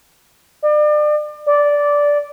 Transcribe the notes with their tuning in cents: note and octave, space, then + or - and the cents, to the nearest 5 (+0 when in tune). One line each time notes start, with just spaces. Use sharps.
D5 +35
D5 -10